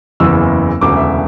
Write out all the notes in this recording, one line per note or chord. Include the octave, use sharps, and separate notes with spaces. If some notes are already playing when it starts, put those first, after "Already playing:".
F#1 E2 C#3 E3 E6
E1 D2 C#3 D6
E5